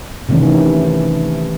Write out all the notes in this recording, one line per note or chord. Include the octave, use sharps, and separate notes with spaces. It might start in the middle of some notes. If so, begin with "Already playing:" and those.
C3 D#3 E3 A3 C#4